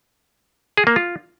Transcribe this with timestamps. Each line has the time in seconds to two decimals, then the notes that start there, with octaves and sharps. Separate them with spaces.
0.77 G#4
0.87 A#3
0.96 F4